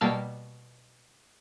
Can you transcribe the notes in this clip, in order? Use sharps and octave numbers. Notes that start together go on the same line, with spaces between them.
B2 G3 A#3 A5 E6 F6